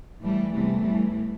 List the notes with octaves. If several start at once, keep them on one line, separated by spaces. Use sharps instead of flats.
A2 E3 G3 A3
E2 C3 E3 G3 A3
A2 E3 G3